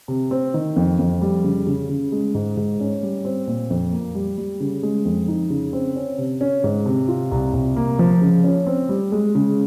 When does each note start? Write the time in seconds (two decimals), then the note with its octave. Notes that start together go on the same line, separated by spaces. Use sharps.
0.08 C3
0.31 C4
0.54 D#3
0.76 F2
0.99 F2
1.22 G3
1.44 C#3
1.67 C#3
1.89 C#3
2.12 G#3
2.35 G#2
2.57 G#2
2.80 C#4
3.03 G3
3.25 C4
3.47 A#2
3.70 F2
3.93 A#3
4.15 G3
4.38 G3
4.60 C#3
4.83 G#3
5.05 F2
5.28 D#4
5.50 C#3
5.73 C4
5.96 C#4
6.18 C3
6.41 C#4
6.64 G#2
6.86 C3
7.08 F4
7.32 C2
7.54 C2
7.76 A#3
7.99 F3
8.21 C#3
8.44 C#4
8.67 C4
8.89 G3
9.12 G#3
9.35 C#3